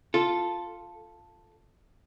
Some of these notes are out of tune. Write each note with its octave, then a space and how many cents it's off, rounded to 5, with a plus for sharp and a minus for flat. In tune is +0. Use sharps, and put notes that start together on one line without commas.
F4 +0 A4 +0